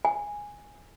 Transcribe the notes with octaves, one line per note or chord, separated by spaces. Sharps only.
G#5